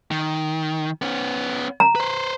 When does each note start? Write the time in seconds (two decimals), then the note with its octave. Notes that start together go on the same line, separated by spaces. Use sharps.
0.11 D#3
1.02 B3 C#4
1.80 A#5
1.95 B4 C5